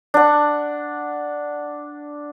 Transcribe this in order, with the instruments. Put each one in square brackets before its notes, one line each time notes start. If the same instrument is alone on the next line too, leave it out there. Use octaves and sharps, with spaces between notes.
[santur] D4 F#5